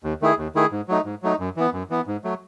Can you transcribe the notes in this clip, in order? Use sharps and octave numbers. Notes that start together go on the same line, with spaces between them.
D#2
D#3 A3 E4 G#4
D#2
D#3 A3 E4 G#4
G#2
F#3 A3 D#4
G#2
F#3 A3 D#4
F#2
E3 B3
F#2
E3 B3
G#2
F#3 A3